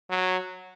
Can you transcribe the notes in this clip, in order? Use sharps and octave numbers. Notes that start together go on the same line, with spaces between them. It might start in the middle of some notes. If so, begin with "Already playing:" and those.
F#3